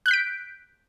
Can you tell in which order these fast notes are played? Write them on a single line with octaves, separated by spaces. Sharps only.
F#6 G6 B6 D7